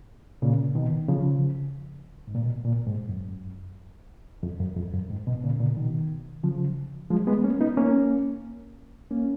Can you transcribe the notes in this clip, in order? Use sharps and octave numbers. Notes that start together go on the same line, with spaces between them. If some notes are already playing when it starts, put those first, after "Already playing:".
A#2 C#3
B2 D#3
C#3 F3
G#2
A#2
B2
A#2
G#2
F#2
F2
F#2
F2
F#2
G#2
B2
A#2 C#3
A#2 C#3
B2 D#3
C#3 F3
F3 G#3
G#3 B3
A#3 C#4
B3 D#4
A#3 C#4
A#3 C#4